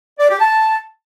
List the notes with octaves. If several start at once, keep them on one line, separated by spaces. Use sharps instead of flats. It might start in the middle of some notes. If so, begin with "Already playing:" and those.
D5
G4
A5